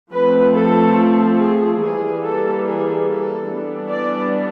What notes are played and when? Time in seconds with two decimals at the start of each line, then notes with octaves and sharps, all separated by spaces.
0.12 F3 A3 C4 B4
0.55 A4
1.38 G#4
1.80 E3 G3 A#3 G#4
2.22 A4
2.65 G#4
3.07 A4
3.49 E3 G3 B3 D4
3.90 D5